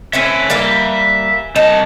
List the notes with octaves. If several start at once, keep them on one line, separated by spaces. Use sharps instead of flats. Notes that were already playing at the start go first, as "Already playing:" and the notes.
A3 C4 C#4 E5 G#5
G3 A#3 F5
C2 D#4 A5